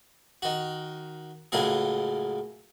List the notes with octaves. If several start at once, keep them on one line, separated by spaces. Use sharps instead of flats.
D#3 F#4
C#2 A2 F#3 A#3 G#4